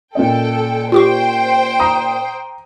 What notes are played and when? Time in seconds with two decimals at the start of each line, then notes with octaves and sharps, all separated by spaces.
0.15 A#2 C#4 A4 D#5 G5
0.92 F4 G4 C5 G5 C#6
1.80 A#5 D#6